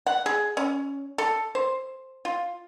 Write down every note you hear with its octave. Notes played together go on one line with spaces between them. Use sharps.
F#5
G#4
C#4
A4
C5
F4